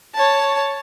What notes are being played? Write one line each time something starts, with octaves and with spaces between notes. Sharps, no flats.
C#5 A5